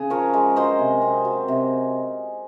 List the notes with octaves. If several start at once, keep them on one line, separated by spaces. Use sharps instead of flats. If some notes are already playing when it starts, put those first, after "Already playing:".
Already playing: C#3 G#4
F3 A#4 C#5
G#3
F#3 C5 D#5
C3
C4
F#3
C3